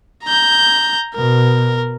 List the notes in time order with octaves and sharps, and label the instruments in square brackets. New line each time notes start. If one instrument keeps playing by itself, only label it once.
[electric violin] A#5 G6
[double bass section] B2 [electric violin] A#4